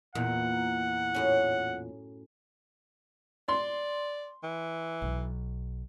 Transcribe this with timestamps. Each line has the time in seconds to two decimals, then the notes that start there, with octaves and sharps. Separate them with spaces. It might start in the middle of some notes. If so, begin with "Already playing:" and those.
0.15 E2 A#2 F#5
1.14 F#2 A2 C#4
3.48 D5 C6
4.43 E3
5.02 B1